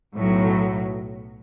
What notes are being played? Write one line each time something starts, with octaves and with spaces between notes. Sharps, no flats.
B1 A2 F#3